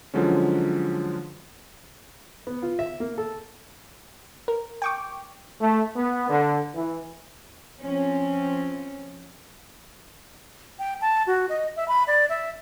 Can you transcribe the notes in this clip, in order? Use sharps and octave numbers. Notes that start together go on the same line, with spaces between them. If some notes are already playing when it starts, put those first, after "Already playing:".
D3 F3 F#3 G#3 C#4
B3
F4
E5
A#3
A4
A#4
G5 C#6 D6
A3
B3
D3
E3
F3 C4 C#4
G5
A5
F#4
D#5
E5
B5
D5
E5